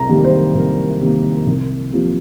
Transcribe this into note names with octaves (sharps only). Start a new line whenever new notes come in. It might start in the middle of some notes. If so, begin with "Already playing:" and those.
Already playing: C2 A#5
C3 D#3 G3 A#3
C5
C2 A#4
C3 D#3 G3 A#3
C2
C3 F3 A#3